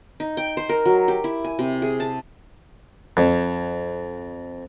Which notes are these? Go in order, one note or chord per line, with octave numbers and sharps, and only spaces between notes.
D#4
G5
C5
A#4
F#3
G4
E4
G#5
C3
G#4
A5
F2